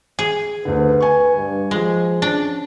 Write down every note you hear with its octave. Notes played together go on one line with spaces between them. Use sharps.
G#4
D2 D3 B4
G#5 C#6
G2
F3 G#3
C#4 D4